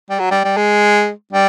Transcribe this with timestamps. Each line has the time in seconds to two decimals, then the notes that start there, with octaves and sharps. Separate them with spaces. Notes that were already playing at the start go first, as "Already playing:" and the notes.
0.10 G3
0.20 F#3
0.31 G3
0.45 G3
0.57 G#3
1.33 G3